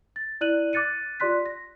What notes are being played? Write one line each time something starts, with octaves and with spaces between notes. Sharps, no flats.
A6
E4 D5 F#6 D#7 F#7
D6 F#6 A6 C#7 D#7
F4 G4 D5 C6 F#6 B6
A#6